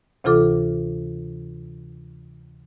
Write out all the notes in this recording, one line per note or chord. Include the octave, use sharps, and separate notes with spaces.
D2 C3 E3 F4 A4 D6